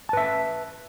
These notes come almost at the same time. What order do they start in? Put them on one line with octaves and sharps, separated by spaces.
A5 B4 E5